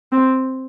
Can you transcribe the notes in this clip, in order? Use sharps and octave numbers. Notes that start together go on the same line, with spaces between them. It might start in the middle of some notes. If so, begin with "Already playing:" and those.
C4